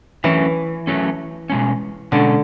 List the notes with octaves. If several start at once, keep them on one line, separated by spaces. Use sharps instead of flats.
E3 F#3 A3 C#4
F#3 A3 C#4
B2 G#3 C#4
B2 D3 G#3 C#4